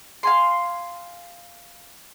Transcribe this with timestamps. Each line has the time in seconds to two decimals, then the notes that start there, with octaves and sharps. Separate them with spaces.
0.23 F5 G#5 C6